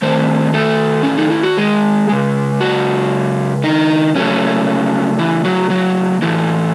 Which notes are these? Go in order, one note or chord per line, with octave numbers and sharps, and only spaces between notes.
D#3 A3 C4 C5
A3 A4
C#4
D#4
E4
F#4
G#3 G#4
C#3 G#3
F#3 F#4
D#3 D#4
C#3 F#3 A3 C#4
E3 E4
F#3 F#4
F#3 F#4
A2 E3 F#3 A3 E4